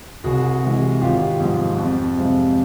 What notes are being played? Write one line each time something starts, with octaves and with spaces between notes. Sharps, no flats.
C2 F#4 G#4
C3 E3 G#3
G#1 F4 G4
G#2 F3
F2
C3 F3 G#3